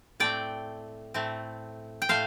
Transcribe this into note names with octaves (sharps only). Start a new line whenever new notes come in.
A2 A3 C4 D5 G5
A2 A3 C4
G5
A2 A3 C5 F5